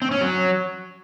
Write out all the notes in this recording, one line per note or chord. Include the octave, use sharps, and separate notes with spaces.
C4
C#4
F#3